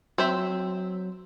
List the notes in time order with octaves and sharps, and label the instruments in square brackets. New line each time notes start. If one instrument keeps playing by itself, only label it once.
[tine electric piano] F#3 [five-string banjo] C4 C5 E5